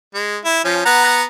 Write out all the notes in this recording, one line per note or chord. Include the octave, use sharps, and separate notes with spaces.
G#3
E4
F3 C#4
B3 F#5 A#5